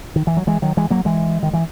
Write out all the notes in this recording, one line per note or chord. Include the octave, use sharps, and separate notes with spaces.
D#3
E3
F#3
E3 G#3
D#3 F#3
E3 G#3
F#3 A#3
E3 G#3
D#3
E3